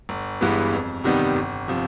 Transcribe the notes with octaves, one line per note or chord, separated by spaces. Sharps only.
G1
G2 E3 G#3 B3
F2
C3 D#3 G3 B3
G1
C3 F3